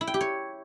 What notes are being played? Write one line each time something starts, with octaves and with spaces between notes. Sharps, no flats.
E4
G5
G4
C#5